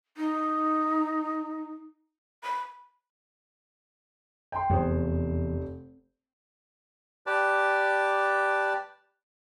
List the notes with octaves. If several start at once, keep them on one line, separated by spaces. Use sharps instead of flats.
D#4
B5
G5 C6
F1 E2 C5
G4 B4 D5 A5